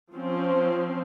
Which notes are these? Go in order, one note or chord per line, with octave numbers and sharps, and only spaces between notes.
F3 C4 C#4